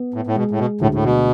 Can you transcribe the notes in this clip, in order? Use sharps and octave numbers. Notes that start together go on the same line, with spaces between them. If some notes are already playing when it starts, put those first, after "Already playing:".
Already playing: B3
A2
A2
B2 G#3
A2
B2
D2 A2
A2
B2